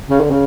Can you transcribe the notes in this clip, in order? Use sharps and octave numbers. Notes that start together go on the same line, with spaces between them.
C#3
D3
C#3